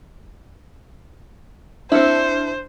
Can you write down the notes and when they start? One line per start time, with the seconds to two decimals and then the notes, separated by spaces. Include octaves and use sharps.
1.92 C4 D4 E4 C5 F6 C#7